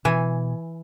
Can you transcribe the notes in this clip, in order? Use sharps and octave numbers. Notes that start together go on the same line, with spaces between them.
B2 E3 G#5